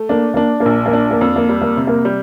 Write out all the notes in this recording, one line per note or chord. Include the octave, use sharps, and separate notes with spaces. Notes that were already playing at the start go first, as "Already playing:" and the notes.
Already playing: A3
A#3 D4
A#3 D4
A#3
A#1
A#3
D4
A#3
F2
A#3
G3
A#3
C3
A#3
G3